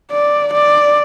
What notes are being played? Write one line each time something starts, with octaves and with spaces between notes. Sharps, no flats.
D5
D5